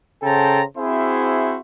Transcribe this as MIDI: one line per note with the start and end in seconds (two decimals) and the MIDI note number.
0.23 0.62 49
0.23 0.62 69
0.23 0.62 72
0.23 0.62 79
0.23 0.62 81
0.23 0.62 82
0.77 1.59 60
0.77 1.59 64
0.77 1.59 66
0.77 1.59 68
0.77 1.59 72
0.77 1.59 76